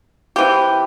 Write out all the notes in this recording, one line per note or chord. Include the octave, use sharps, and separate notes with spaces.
E3 C4 G4